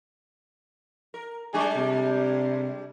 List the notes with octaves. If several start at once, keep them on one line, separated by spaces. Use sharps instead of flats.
A#4
G3 G#3 D4 G#4
C3